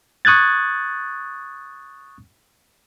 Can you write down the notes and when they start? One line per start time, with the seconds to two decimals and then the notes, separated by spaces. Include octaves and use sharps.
0.25 C#6 D#6 F#6 G#6 A6